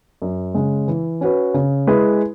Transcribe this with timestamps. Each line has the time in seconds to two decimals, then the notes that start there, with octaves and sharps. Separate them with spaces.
0.22 F#2
0.55 C#3 G#3
0.88 E3
1.21 C#4 F#4 B4
1.54 C#3
1.87 G#3 E4 G#4 B4